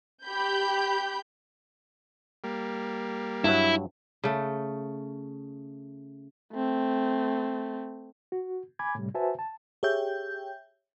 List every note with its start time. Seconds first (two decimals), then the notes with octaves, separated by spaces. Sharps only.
0.24 G4 B5 G6
2.44 G3 A#3
3.44 G2 F#3 E4
4.24 C#3 A3
6.53 A3 C4
8.32 F#4
8.79 G#5 B5 D6 G#6
8.95 A2 C3 G3
9.14 F#4 B4 C5 E5 G#5 A5
9.39 A5
9.83 G4 G#4 C#5 E5 G5 G6